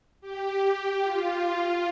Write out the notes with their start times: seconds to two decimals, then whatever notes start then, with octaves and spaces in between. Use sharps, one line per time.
0.21 G4
1.03 F4